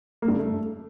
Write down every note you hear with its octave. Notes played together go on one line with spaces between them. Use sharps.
A#3
G2
C#3
A3